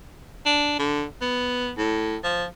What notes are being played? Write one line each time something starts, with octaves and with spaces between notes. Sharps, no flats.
D4
D3
B3
A2
F3